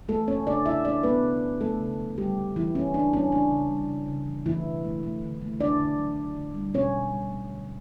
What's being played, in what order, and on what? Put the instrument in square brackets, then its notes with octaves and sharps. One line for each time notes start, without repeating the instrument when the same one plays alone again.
[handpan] E3 A3 A4
A3 C#4 C#5
C#3 D4 D5
C#3 E4 E5
E3 D4 D5
B3 B4
C#3
E3
C#3 A3 A4
C#3
F#3
D3 G3 G4
D3
E3 G3 E4
C#3 C#4
C#3 D4
G3 C#4
C#3 D4
C#3
G3
C#3
C#3
E3
E3 A3 E4
B2
A3
A3
D3
A3
D3 D4 D5
D3
F#3
D3
D3
G3
B2 C#4 C#5
B2
G3
A3
D3